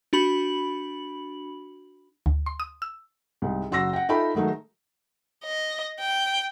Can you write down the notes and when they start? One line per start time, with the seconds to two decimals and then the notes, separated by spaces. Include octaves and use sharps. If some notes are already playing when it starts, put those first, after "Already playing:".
0.13 D4 F#4 B5 F#7
2.26 D2
2.46 C6
2.60 D#6
2.82 E6
3.42 C2 G#2
3.71 F#1 F#4 C6 E6 A#6
3.93 F#5 G5
4.09 D#4 F4 A4 E5 G5 B5
4.35 D#3 F#3 G#3 A3 D#4
5.44 D#5
6.00 G5